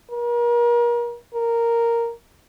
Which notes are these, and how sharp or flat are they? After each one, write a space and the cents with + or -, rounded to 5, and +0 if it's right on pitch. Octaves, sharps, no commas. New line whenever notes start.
A#4 +35
A#4 -5